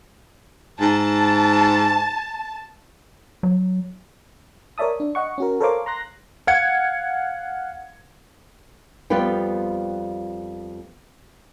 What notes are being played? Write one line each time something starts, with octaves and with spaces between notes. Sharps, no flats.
G#2 A5
F#3
A#4 C#5 D5 E5 A5 D#6
D4
D#5 F#5 C#6
C#4 F#4 A#4
A4 A#4 C5 C#5 F5 D6
A#5 C6 F#6 A#6
F5 F#5 G#6 C#7
F2 G3 B3 F4 B4 G5